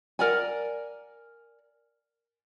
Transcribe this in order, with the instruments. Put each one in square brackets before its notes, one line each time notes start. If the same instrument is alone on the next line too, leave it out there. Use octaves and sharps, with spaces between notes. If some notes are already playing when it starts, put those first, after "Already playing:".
[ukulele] A#4 D5 F#5 G#5